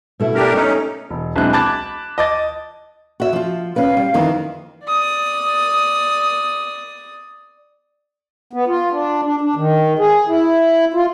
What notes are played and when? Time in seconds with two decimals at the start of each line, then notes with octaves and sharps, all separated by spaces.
0.20 B2 A3 E4
0.35 D4 G4 A#4
0.54 A3 C#4 D#4
1.11 E1
1.36 B1 G#3 C4 D4 E4 F#6
1.53 A5 B5 D6 F#6 G#6 A6
2.18 D#5 A5 D6 D#6 A6
3.20 F#4 E5
3.33 F3 F4
3.76 C#4 B4 F5
3.97 G3
4.14 F2 D#3 E3
4.85 D5 D#6
8.53 B3
8.67 F4
8.91 D4
9.23 D4
9.41 D4
9.56 D#3
9.99 G#4
10.28 E4
10.94 F4